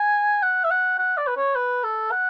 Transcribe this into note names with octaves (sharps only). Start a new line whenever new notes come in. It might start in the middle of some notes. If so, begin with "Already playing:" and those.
Already playing: G#5
F#5
E5
F#5
F#5
D5
B4
C#5
B4
A4
F#5